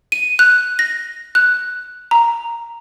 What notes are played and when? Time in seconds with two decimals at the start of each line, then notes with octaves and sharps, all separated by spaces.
0.12 D#7
0.39 F#6
0.79 A#6
1.35 F#6
2.11 A#5